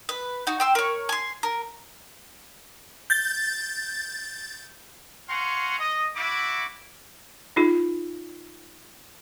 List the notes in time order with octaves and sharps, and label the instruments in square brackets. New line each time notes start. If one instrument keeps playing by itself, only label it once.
[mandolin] B4
D#4 F#4
G5 C6 E6
A#4 C#5
G#5 C6
A#4
[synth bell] G6 A6
[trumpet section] F5 F#5 G#5 A#5 C6 C#6
D#5
E4 F#4 D6
[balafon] D#4 F4 G#4